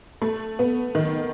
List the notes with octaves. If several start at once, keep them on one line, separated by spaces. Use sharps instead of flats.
A3
B3
D#3